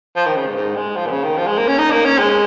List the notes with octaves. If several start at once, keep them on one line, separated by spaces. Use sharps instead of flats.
F3
D#3
C#3
G#2
G#2
G#3
F3
A#2
C#3
D#3
F3
G#3
A#3
C#4
D#4
A#3
C#4
G#3